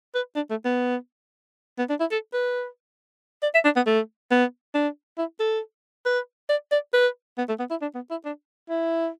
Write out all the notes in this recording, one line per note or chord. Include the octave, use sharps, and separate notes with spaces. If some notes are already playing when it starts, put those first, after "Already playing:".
B4
D4
A3
B3
B3
D4
E4
A4
B4
D5
E5
D4
B3
A3
B3
D4
E4
A4
B4
D5
D5
B4
B3
A3
B3
E4
D4
B3
E4
D4
E4